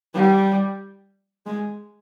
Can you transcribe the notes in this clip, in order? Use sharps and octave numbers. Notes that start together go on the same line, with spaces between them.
G3
G#3